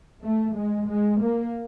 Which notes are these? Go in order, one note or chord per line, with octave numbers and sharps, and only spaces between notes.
A3
G#3
G#3
A#3